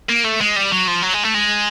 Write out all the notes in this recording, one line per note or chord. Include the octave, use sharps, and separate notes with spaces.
A#3
A3
G#3
G3
F#3
F3
F#3
G#3
A3
G#3